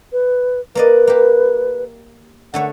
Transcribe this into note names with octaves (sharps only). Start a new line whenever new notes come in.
B4
A#3 B4 D5 D#5
A#3 G4
D3 A3 C#5 F#5